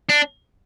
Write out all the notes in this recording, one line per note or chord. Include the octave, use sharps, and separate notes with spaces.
D4